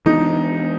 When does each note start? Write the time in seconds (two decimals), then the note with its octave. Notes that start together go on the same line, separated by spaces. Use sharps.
0.06 E3 G#3 B3 D4 D#4